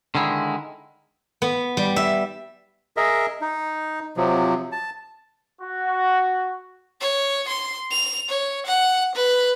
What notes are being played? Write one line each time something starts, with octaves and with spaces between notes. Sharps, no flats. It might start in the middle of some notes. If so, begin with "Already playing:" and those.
D3 D#3 G#3 E4
B3
G3
E5
G#4 A#4 D#5 E5
D#4
C3 F3 F#3
A5
F#4
C#5
C6
F7
C#5
F#5
B4